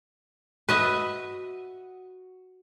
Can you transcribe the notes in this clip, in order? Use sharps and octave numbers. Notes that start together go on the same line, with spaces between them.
F#4 B4 D#5 E5